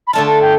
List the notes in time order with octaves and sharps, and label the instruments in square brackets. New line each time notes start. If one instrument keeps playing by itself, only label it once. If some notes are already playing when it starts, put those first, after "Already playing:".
[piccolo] B5
[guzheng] D3 A3 D4 F4 [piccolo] A5
[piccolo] A5
G5